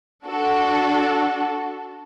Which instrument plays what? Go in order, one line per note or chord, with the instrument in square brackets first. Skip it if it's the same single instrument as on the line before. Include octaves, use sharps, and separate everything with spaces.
[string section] D4 F#4 A4